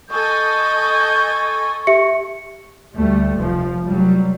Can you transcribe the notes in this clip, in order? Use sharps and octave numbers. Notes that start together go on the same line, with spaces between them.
A4 D#5 G#5 C#6 G6
G4 E5 C#7
D2 G3 A3
F1 F3
F1 F#3 G3